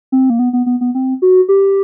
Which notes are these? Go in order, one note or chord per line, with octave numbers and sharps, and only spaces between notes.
C4
A#3
B3
B3
B3
B3
C4
F#4
G4